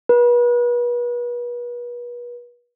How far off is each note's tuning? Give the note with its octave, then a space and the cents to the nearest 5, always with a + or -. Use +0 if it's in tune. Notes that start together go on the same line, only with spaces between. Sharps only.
B4 -35